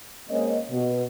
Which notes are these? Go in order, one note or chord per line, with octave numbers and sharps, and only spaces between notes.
G#3 A#3 C4 C#4 C#5 D#5
B2